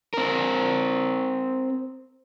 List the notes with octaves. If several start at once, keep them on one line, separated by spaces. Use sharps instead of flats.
C4 A#4